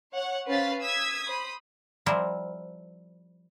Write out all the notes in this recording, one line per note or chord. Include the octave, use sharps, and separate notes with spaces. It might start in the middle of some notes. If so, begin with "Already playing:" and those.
C#5 F#5
C#4 B4 C5 F5 A6 B6
D#6 E6 G#6 B6
C5 B5 D#6
F3 G3 C4 E4 A#4 C5